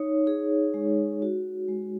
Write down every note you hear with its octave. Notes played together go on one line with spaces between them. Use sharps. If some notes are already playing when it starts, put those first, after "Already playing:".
Already playing: D#4 C#5
G#4
G#3
F#4
G#3